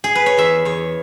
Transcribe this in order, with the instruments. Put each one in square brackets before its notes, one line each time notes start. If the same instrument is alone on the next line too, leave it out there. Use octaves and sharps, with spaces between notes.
[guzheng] G#4
B4
C#5
E2 E5
E2 C#5